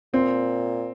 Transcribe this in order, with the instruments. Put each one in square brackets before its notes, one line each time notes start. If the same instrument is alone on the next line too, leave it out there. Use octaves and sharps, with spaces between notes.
[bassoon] A#2 [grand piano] C4